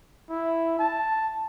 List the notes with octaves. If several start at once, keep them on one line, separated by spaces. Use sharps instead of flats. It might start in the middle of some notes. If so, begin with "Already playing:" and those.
E4
A5